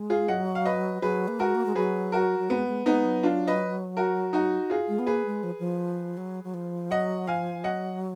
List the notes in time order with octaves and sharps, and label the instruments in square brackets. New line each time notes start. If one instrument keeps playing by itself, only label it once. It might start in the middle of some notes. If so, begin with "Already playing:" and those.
Already playing: [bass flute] G#3
[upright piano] F4 G#4
[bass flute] F#3 [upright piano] D#5 F#5
[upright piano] F5
B4 D#5
[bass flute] F#3 [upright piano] G#4 B4
[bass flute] A#3
[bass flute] G#3 [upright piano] F#4 A#4
[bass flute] A#3
G#3
[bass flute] F#3 [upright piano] G#4 B4
[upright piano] F#4 A#4
[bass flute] F#3
[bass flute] G#3 [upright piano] B3
[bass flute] G#3
[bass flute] G#3 [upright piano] B3 D#4
[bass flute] F#3
[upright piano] D4 F4
B4 D#5
F#4 A#4
D#4 F#4
F4 G#4
[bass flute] G#3
B3
[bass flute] A#3 [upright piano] G#4 B4
[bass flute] G#3
F3
F3
F#3
F#3
F3
[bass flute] F#3 [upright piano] D#5 F#5
[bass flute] F3 [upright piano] F5 G#5
[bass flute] F#3 [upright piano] D#5 F#5